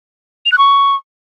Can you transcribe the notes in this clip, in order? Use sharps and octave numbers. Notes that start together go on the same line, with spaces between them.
F7
F#6
C#6